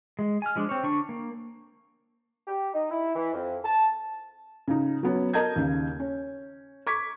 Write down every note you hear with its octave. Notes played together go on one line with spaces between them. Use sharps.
G#3
G#5 F6
F3 G#3 D4
C4 C#5
D3 D4 C#6
A#3
G4
D#4
E4
E3
F2
A5
C#3 D#4
F#3 B3 C#4
A#4 D#5 A5 A#5 G6 G#6
D#2 C#3
C#4
C#6 D6 G#6 B6